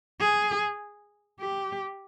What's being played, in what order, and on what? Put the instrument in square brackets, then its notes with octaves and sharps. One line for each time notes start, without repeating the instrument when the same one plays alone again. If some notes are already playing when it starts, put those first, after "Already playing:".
[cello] G#4
G4